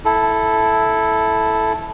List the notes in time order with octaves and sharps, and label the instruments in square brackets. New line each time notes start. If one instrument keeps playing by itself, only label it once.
[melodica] E4 A4